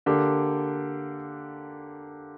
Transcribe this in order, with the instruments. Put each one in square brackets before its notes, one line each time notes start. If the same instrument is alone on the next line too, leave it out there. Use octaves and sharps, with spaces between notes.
[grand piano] D3 A#3 D4 G4